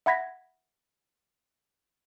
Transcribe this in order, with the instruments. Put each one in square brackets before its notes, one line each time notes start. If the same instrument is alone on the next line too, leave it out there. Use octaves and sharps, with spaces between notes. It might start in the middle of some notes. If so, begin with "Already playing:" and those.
[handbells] E5 F#5 B5 G#6 A#6 B6